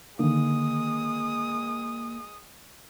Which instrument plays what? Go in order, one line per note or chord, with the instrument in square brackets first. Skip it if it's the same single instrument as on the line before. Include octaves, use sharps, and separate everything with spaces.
[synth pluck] D3 D#3 [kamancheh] G#3 D#6 [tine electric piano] A#3